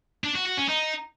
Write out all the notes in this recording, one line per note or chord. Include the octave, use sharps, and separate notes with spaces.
D4
F#4
F#4
C#4
D#4